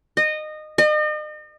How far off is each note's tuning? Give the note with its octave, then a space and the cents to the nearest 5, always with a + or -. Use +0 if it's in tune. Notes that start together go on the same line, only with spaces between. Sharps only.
D#5 -20
D#5 -40